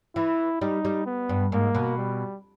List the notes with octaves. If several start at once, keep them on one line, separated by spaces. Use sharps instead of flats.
E3 E4
G3 D#4
G3
B3
G2
G#2 A#3
B2
G3